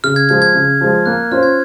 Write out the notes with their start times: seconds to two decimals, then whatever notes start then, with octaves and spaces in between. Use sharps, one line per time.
0.04 C#3 F6
0.16 G#6
0.29 F3 G#3 G#6
0.42 G#6
0.54 C#3
0.81 F3 G#3
1.06 A#3 F#6
1.31 C#4 F4 C5 F6
1.43 G#6